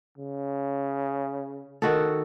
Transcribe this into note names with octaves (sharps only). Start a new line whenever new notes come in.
C#3
D#3 F#4 A4